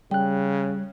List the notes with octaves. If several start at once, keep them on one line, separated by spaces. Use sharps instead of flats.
C#3 G3 G5 F#6